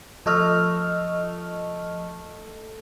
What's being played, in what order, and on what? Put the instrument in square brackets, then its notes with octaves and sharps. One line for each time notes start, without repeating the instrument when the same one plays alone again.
[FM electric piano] F3 D#5 F6 [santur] A3